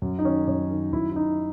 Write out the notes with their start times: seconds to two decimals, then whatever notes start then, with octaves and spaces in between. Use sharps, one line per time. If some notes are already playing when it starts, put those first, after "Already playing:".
0.02 F#2
0.19 D#4
0.25 D#3 C#4
0.47 F#2 C#4
0.71 D#3
0.93 F#2 E4
1.12 E4
1.15 D#3 D#4